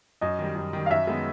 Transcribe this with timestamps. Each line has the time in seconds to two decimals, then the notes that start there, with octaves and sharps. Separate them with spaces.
0.21 F#2 D#5
0.39 D#3 G3
0.55 F#2
0.73 D#3 G3
0.86 F5
0.90 F#2 E5
1.07 D#3 G#3 B3 D#4